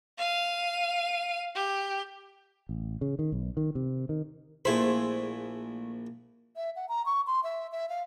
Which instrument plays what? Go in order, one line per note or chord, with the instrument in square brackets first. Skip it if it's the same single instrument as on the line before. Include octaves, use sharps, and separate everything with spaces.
[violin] F5 D#7
G4
[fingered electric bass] A1
C#3
D#3
B1
D#3
C3
D#3
[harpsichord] A#1 E4 B5 [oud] A3 G#4 C5
[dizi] E5
F#5
A#5
C#6
C6
E5
E5
F5